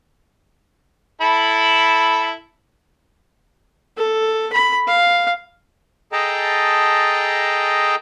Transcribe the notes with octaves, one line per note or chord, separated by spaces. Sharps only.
E4 A4 B5
A4
B5
F5
G#4 A4 D#5 G5 A5 A#5